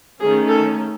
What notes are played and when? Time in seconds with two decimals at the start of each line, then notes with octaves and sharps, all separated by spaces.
0.20 D#3 A3 C#4 G#4
0.48 A4